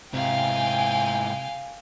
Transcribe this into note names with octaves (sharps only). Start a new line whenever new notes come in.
G#2 C3 E4 F5 G5 G#5